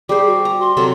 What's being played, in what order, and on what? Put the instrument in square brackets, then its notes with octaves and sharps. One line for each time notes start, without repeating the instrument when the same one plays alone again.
[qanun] G3 C5 [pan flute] G#4 [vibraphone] D6
[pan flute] F#4
[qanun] A#5
[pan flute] C6
[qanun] C3 F#3 A4